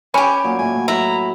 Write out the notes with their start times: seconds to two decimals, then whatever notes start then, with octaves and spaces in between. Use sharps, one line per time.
0.14 C#4 G4 G#5 B5
0.44 A#2 F#3 G#5
0.59 A2 G#5
0.88 F#3 E4 A#5